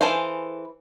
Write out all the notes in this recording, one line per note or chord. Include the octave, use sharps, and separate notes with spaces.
E3 G#4 A4 C5 F5